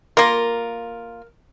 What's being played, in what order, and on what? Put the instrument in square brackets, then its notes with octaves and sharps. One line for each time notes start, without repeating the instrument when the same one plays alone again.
[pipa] A#3 F4 [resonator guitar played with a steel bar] A#4